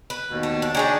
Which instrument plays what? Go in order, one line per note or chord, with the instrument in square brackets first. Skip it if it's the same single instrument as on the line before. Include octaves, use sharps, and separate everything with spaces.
[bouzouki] B4
[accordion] D#2 B2
[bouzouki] A3
D4
[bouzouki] D#3 G#4 D5 [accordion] D4 C#5